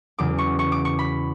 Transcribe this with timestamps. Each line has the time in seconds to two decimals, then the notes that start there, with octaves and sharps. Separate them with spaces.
0.19 E2 C#3 F#3 D6
0.38 C#6
0.59 C#6
0.72 D6
0.85 C#6
0.99 B5